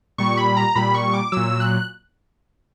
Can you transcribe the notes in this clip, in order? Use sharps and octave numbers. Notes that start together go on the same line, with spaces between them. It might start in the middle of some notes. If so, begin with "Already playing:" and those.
A#2 G3 C#6
B5
A#5
A#2 G3 B5
C#6
D6
A#2 F#3 E6
F#6